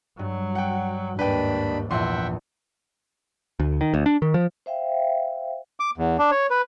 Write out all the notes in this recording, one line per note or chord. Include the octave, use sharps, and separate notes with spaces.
G2 F#3
F#5 G5
D#2 G#2 D4 B4 G5 B5
A#1 E2 A#2 E5 F#5 G5 C6
D2
D#3
D2
D4
D#3
F3
C5 E5 F5 G5
D6
E2
D4
C#5
B4